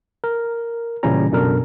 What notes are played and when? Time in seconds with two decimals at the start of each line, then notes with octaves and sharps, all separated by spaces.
0.24 A#4
1.03 A#2 C#3 E3 G3 C#4 A#5
1.31 F#2 B2 D4 A4 A#4